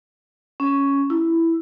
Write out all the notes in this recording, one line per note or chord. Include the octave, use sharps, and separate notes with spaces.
C#4
E4